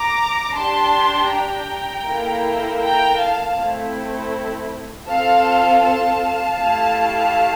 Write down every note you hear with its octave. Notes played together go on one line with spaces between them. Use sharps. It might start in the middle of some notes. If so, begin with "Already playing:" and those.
Already playing: A#5 D6
D4 G4 A5 C6
G5 A#5
A#3 E4 A4
G5 A#5
F5 A5
A3 C4 E4
C4 F4 A4 F5 A5
F5 A5
A3 E4 G4